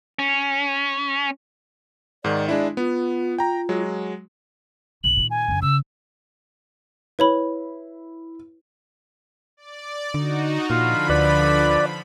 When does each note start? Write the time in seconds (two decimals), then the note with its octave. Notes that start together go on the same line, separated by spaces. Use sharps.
0.19 C#4
2.24 G#2 D#3 D5
2.48 G#3 D4 E4 D5
2.77 B3 F4
3.38 G5 A#5
3.69 F#3 G#3
5.04 B1 G2 F#7
5.17 A#2 D#3
5.31 G#5
5.48 F#2 D3
5.62 C#3 E6
7.19 E4 B4 C#5 B5
9.57 D5
10.14 D3 D#4 F#4
10.70 A#2 D3 F3 F4 B5
11.10 D2 B4 D5